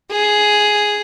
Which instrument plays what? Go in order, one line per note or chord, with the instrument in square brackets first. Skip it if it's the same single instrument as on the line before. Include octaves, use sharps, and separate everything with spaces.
[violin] G#4